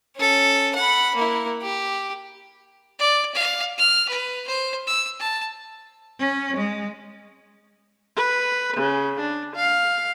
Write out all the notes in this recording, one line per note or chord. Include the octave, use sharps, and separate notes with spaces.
C#4 A4
F#5 B5
A#3 E4
G4
D5
F5
F6
B4
C5
E6
A5
C#4
G#3
B4
C#3
D4
F5